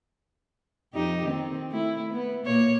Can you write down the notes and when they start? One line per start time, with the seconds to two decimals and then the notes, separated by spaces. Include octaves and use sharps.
0.94 F2 D#4 G4
1.27 D#3 C4
1.71 A3 E4
2.13 B3
2.45 A#2 A#3 C#5